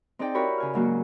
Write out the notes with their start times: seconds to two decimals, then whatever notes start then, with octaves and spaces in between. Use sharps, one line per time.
0.19 C4 D#4 G#4 D5 G5
0.35 E4 F#4 G4 A#4 C#5 B5
0.58 C#3 G#5 F6
0.74 G#2 F#3 A#3 F#4